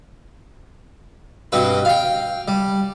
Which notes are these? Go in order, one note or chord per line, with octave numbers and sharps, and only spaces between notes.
G2 B2 C4 B4
F5 G5
G3